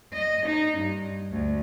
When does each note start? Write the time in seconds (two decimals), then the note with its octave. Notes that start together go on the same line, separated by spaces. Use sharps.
0.13 D#5
0.46 D#4
0.78 G2
1.31 D2